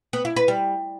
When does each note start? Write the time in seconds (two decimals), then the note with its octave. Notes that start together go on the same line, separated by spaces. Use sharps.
0.13 B3
0.25 E4
0.36 B4
0.48 G3